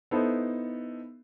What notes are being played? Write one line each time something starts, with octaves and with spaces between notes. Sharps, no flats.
B3 D#4 E4 A4 C5